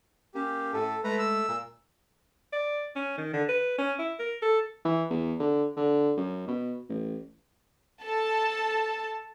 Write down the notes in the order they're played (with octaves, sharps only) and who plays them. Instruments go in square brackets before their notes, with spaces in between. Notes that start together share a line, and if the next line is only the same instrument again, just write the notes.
[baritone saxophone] A#3 [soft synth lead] C#4 [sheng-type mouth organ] G4
[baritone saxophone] A2 [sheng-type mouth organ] A4
[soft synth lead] G#3 [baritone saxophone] A3 [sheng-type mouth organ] B4 A#5
[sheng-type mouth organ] E6
[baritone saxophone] A#2
[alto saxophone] D5
C#4
D#3
D3
B4
C#4
E4
A#4
A4
[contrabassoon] E3
E2
D3
D3
F#2
B2
A1
[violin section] A4 A5